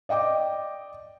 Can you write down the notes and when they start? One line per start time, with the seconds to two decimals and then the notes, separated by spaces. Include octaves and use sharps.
0.09 D5 D#5 G5 D6